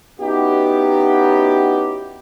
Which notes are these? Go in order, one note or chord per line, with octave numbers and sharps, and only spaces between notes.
B3 C#4 D#4 E4 F#4 G4